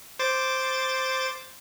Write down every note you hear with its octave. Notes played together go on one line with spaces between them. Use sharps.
C5 D6 A6